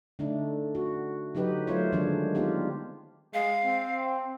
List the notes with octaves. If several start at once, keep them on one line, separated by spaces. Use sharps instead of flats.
D3 A3 D4 D#4
F#4
D3 F#3 D#4 G4 B4
F#3 A3 A#3 F4 C5 C#5
D3 D#3 F3 F#3 G#3 D4
G3 B3 C4 D#4 F4 G4
G#3 F5
C4